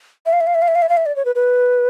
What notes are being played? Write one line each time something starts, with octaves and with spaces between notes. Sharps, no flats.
E5
F5
E5
F5
E5
F5
E5
F5
E5
F5
E5
D5
C#5
B4
B4